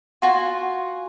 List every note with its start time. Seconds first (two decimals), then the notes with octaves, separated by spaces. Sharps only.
0.22 F4 F#4 G#5